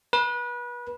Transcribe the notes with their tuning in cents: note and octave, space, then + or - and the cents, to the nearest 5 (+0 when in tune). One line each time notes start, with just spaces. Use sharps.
B4 -30